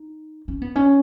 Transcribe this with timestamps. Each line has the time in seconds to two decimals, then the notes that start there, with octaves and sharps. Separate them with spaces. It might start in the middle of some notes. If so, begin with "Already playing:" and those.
Already playing: D#4
0.48 C#4
0.62 B3
0.76 C#4